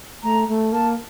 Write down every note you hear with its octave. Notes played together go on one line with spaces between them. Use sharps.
A3 A#5
A3
A#3 A5